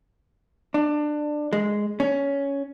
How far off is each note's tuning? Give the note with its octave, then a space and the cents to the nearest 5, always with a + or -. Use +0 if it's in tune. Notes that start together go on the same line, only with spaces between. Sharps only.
D4 +20
G#3 +0
C#4 +10